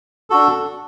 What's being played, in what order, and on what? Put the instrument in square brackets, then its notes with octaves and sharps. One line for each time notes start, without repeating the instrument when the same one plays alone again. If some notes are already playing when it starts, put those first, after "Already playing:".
[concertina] D4 F#4 A4